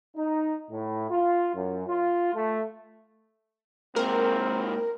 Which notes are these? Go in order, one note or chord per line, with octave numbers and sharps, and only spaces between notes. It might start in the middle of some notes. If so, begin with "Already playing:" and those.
D#4
A2
F4
F#2
F4
A3
G#2 A#3 C4 A#4